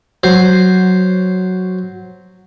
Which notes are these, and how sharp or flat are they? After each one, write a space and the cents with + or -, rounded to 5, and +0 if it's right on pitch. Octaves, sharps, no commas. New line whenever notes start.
F#3 +0 C5 +0